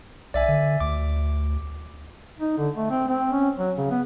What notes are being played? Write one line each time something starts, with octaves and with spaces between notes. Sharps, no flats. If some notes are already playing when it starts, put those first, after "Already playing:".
B1 D5 E5 G#5
D3
D2 D6
D#4
D3
A3
C4
C4
C#4
F#3
C#3
B3